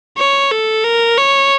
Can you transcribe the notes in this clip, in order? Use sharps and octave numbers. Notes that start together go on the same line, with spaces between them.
C#5
A4
A#4
C#5